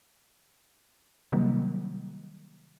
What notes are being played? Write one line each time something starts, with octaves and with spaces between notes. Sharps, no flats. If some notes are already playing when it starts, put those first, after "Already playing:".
C3 D#3 F#3 G3 A#3